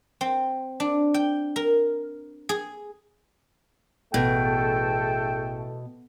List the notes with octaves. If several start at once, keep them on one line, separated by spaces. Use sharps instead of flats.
C4
D4
G5
A#4
G#4
A1 E2 B2 A3 A4 G5